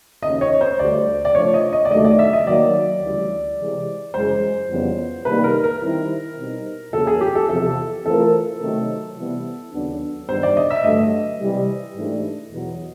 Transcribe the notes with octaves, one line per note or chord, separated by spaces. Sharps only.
D#2 C#3 F3 A#3 C#4 D#5
C#5
C5
D2 D3 G3 D5
D5
F3 A3 D4 C#5
D#5
D#5
D5
D#2 D3 F#3 A3 D#5
D5
E5
D#5
D#3 F#3 A#3 D5
D2 C#3 E3 G3
C3 E3 G#3
F#2 C#3 E3 G#3 C5
F2 C#3 E3 G3 B3
C3 D#3 G3 A#3 D#4 B4
A#4
A#4
D#3 G3 C4 E4
B2 G3 C4 D#4
E2 C#3 F#3 A#3 A4
G#4
G4
A4
E2 C3 F3 A4
E3 A3 C4 F4 A4 A#4
C3 D#3 F#3 A3 C4
C3 E3 G3 B3
D#2 C#3 F#3 B3 D4
G2 D#3 G3 B3 D4 C5
D5
D#5
E5
G2 D3 F#3 A3 D#5
C3 E3 G3
G#2 E3 A3 D4 G4
E2 B2 F#3